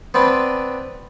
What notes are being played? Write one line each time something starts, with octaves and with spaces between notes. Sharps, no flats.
B3 C4 D4 B4